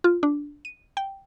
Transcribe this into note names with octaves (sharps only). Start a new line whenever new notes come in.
F4
D4
D#7
G5